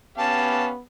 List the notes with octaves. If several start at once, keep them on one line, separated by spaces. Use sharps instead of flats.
B3 C#4 G4 F5 A5